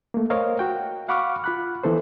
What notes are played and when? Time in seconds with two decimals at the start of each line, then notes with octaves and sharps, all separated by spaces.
0.14 A3 A#3
0.30 A#4 C5 C#5 D#5 F5
0.59 F#4 G5
1.09 F5 F#5 B5 C#6 D6 F6
1.44 F4 B5 F#6
1.84 E3 B3 A4 C5